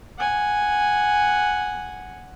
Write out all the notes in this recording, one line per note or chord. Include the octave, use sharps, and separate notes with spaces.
F#5 G#5